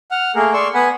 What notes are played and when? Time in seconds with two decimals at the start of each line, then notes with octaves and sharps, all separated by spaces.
0.11 F#5 F6
0.35 A3 A#3 G#4 A#4
0.53 D5 C6 C#6 E6
0.74 B3 F#5 G#5 B5